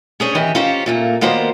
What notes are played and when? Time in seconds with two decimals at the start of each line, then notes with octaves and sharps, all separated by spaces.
0.20 C#4 D4 G#4 C5 C#5
0.35 D#3 E3 E4 G4
0.55 C#4 D#4 F4 G4 C5 C#5
0.86 A#2 A3 A#3
1.21 D#3 A#3 B3 F#4 C5 D5